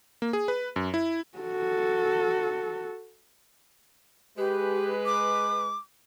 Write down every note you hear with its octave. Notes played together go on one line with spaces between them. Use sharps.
A#3
G#4
B4
F#2
E4
F#4 A4
G#3 G4 B4
D6